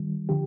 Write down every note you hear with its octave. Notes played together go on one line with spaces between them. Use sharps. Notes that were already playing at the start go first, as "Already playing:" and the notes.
Already playing: D#3 G3
D3 F3 G4